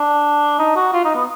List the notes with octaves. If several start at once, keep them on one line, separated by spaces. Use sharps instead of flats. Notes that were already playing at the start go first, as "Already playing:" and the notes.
Already playing: D4
D#4
F#4
F4
D#4
B3